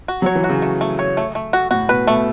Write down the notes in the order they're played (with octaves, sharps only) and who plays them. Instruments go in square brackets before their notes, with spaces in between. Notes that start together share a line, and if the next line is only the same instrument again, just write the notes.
[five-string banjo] F#4
[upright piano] F#3
[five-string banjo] C#5
[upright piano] E3
[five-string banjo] F#4
[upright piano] C#3
[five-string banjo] A3
A3
C#5
A3
A3
F#4
[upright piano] A2 [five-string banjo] F#4
[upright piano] B2 [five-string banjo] B4
[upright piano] B2 [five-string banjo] A3